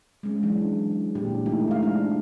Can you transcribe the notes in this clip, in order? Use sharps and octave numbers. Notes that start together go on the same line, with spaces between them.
G#3 C#4
E3 F#3 D4
A#2 D3 E3 D4 G4
E3 A3 D#4 E4
G#3 F5
D4